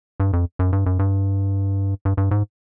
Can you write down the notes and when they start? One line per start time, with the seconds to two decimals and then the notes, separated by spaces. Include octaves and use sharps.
0.20 G2
0.33 F2
0.59 F#2
0.73 G2
0.86 F#2
0.99 G2
2.05 G2
2.17 G2
2.31 G#2